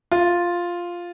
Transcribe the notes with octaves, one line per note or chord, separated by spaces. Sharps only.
F4